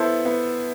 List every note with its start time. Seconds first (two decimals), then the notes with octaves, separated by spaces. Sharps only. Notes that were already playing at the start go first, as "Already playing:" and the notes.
Already playing: B3 E4 A4 C5
0.26 B3